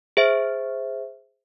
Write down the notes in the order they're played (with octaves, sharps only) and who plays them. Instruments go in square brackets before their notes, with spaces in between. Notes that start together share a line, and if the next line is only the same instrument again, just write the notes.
[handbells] G#4 C5 E5